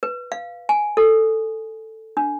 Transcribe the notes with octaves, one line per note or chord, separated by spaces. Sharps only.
B4
F5
G#5
A4
D4